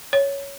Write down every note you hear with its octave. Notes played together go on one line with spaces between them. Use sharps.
C#5